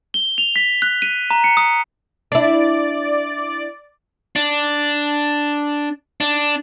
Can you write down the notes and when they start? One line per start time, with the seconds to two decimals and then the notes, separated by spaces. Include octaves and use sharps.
0.14 G7
0.38 F7
0.56 B6
0.82 F#6
1.02 D#7
1.31 A#5
1.44 C#7
1.57 D#6
2.32 D4 E4 D5
4.36 D4
6.20 D4